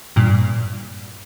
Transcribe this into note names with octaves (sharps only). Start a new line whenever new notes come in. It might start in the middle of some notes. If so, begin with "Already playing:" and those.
G2 A#2